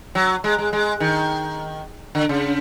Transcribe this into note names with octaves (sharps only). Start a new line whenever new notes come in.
F#3
G#3
G#3
G#3
D#3
D3
C#3